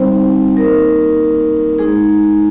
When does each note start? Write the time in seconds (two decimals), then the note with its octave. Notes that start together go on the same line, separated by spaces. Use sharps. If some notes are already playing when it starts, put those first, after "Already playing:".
Already playing: G3 C4 D#4 C5
0.57 A#3 D#4 A#4
1.78 G#3 D#4 G#4